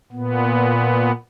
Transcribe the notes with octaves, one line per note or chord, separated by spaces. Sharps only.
A#2 B3